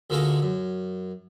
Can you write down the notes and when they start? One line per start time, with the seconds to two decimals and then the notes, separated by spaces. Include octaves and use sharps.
0.10 D2 A#2 D3 G#3 A#3 A#4
0.42 F#2